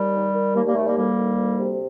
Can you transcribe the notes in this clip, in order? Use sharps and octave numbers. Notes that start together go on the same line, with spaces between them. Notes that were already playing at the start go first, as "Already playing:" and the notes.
Already playing: D#2 G3
D#3
D#3
D#2 G3 A#3
G3 A#3
D#2 A3
G3 A#3
D2 G3 A#3
D#3
D2
C3